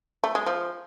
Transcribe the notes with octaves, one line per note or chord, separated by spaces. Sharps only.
A3
G#3
F3